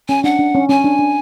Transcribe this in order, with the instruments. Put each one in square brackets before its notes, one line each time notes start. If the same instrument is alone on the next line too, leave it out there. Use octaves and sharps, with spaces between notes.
[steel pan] C#4 [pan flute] G#5
[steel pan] D4 [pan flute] F#5
[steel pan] D4
C#4
[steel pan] C#4 [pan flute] G#5
[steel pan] D4
D4